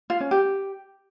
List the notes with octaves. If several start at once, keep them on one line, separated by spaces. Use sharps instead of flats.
F4
C#4
G4